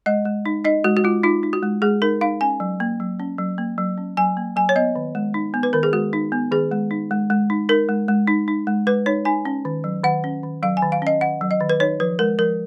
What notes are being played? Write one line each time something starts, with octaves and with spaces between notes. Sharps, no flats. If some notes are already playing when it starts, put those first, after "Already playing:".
G#3 D#5
G#3
D#4
D#4 D#5
G#3 F#4
F#4
G#3 F4
D#4 F4
D#4
F#4
G#3
G#3 G#4
D#4 A#4
D#4 F5
C#4 G#5
F#3
A#3
F#3
C#4
F#3
A#3
F#3
C#4
F#3 G#5
A#3
F#3 G#5
C#5
B3 D#5
D#3
G#3
D#4
B3
B4
D#3 A#4
G#4
G#3 F#4
D#4
B3
D#3 G#4
G#3
D#4
G#3
G#3
D#4
D#4 A#4
G#3
G#3
D#4
D#4
G#3
G#3 B4
D#4 C#5
D#4 G#5
C#4
D#3
F#3
D#3 F#5
C#4
D#3
F#3 F5
G#5
D#3
F5
C#4 D#5
D#3 F#5
F#3
D#5
D#3
B4
D#4 C#5
F3 B4
G#3 A#4
F3 A#4